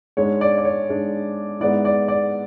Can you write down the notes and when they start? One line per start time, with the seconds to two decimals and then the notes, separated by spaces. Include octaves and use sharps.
0.17 G#2 G#3 D4 C#5
0.41 D5
0.58 D5
0.65 C#5
0.89 G#2 G#3 D4
1.60 G#2 G#3 B3 E4 D5
1.85 D5
2.08 D5